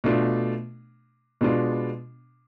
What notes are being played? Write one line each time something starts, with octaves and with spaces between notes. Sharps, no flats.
B2 A3 D4 F4
B2 G#3 B3 D4 F4